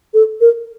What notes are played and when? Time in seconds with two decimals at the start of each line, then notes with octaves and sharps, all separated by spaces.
0.14 A4
0.41 A#4